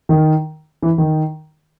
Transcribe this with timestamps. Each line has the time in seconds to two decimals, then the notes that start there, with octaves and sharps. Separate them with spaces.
0.09 D#3
0.82 E3
0.98 D#3